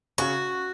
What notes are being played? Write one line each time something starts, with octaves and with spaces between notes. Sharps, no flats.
C#3 C#4 F#4